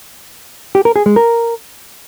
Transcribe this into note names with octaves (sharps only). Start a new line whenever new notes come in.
G4
A#4
G#4
G#3
A#4